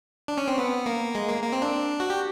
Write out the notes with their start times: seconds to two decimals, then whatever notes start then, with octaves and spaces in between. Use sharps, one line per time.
0.28 D4
0.38 C#4
0.48 C4
0.58 B3
0.86 A#3
1.15 G#3
1.28 A#3
1.43 A#3
1.52 C4
1.62 D4
2.00 F#4
2.10 G4